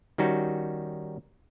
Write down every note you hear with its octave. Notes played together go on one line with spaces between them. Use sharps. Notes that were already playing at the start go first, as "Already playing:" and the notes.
D#3 G3 C#4 D#4 F#4